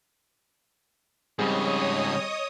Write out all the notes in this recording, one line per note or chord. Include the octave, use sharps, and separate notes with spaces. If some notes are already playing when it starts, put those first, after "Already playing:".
G#2 C#3 G3 C4 G#4 C#5 D#5 D#6